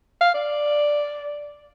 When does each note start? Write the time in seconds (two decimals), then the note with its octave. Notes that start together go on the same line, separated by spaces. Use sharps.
0.21 F5
0.34 D5